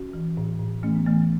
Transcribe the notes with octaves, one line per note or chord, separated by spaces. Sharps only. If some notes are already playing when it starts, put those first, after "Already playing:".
Already playing: C#4 F#4
E3
A2
A2
E3 A3 C#4
B3
E3 A3